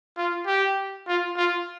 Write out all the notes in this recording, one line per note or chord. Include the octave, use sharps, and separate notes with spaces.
F4
G4
F4
F4